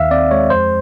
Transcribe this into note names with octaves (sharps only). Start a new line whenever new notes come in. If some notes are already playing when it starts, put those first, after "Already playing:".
Already playing: D#2 D#3 E5 F5
C4 D5
G#3 C#5
F2 C5